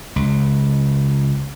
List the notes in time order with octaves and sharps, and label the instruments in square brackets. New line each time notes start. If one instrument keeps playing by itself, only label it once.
[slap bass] C#2